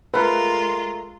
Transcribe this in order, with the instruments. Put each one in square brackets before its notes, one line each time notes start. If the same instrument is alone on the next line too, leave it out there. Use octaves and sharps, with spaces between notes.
[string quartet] G#3 F4 [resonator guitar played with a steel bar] A3 A#4 [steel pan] B4